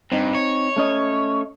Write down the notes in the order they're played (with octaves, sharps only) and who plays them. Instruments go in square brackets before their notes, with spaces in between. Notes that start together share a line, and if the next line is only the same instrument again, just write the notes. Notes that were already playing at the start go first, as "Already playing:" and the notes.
[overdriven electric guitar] G2 [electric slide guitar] C4 D#4
[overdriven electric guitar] C#5
[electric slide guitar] A3 C#4 D#5